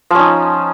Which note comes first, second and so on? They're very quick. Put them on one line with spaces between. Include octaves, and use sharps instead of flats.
F3 C#4 D#4